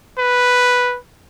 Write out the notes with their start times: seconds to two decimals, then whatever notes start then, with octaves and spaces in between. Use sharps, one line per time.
0.19 B4